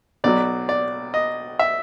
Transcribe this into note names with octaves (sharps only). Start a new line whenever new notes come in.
B1 B2 F#3 D5
D5
D#5
E5